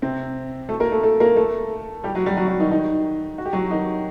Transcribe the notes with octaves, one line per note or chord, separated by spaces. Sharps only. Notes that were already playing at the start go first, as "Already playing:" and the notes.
C3 C4
A3 A4
A#3 A#4
A3 A4
A3 A4
A#3 A#4
A3 A4
G3 G4
F#3 F#4
G3 G4
F#3 F#4
F#3 F#4
D#3 D#4
D#3 D#4
F#4
G4
F#3 F#4
D#3 D#4